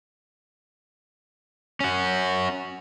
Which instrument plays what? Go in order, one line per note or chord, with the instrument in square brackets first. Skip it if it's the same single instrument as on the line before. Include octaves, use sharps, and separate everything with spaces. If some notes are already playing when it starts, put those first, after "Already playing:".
[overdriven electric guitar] C#4 F#4